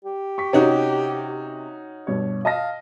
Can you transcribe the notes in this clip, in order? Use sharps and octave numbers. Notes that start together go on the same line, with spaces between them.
G4
C#6 B6
C3 C#4 D#4 F#4
G2 B2 C#5
D#5 F5 A5 A#6